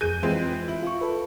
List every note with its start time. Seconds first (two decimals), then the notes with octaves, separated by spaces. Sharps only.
0.01 F2 G#4 G6 D#7
0.23 E3 G#3 C4 F4
0.68 E4
0.82 F4 C#6
1.01 A4 B4